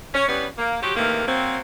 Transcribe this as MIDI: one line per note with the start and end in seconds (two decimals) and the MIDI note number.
0.14 0.27 61
0.28 0.47 52
0.28 0.47 55
0.28 0.47 59
0.28 0.47 61
0.58 0.82 58
0.82 0.96 53
0.82 0.96 54
0.82 0.96 66
0.82 0.96 67
0.96 1.25 48
0.96 1.25 51
0.96 1.25 52
0.96 1.25 57
0.96 1.25 58
1.26 1.57 54
1.26 1.57 58
1.26 1.57 60